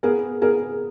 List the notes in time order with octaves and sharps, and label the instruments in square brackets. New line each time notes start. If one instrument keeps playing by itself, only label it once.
[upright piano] B3 [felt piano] G#4 A#4
[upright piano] B3 [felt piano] G#4 A#4